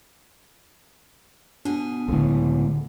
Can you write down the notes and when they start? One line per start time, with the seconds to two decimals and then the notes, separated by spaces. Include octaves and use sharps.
1.65 B2 D4 G#4
2.08 C#2 A2 D3